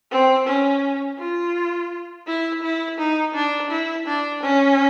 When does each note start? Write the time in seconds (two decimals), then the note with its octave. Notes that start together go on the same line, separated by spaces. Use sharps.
0.11 C4
0.47 C#4
1.19 F4
2.27 E4
2.63 E4
2.99 D#4
3.35 D4
3.71 E4
4.07 D4
4.43 C#4